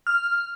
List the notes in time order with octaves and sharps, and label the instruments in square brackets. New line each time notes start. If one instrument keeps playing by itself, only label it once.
[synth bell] F6